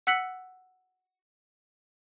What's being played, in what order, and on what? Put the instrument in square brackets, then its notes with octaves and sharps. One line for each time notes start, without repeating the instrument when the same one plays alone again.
[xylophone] F#5 E6 F#6 B6 C#7 F#7